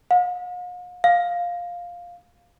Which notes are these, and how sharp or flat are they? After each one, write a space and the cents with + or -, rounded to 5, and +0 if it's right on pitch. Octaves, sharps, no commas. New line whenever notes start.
F5 +45
F5 +5